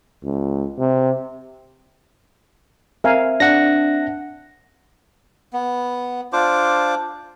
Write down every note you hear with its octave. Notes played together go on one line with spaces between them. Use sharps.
C#2
C3
C4 A#4 E5 F5 G#5
D4 F#5 A#6
B3
D4 F4 C5 D6